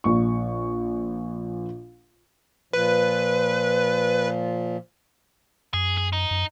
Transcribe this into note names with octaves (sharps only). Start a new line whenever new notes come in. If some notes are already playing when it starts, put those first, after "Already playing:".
A#1 C#6
A#2 F3 B4
F#2 G#4
G#4
D#4
F#2